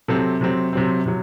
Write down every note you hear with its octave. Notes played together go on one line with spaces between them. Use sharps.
C3 F#3 C4 A4
C3 F#3 C4
C3 F#3 C4
C3 F#3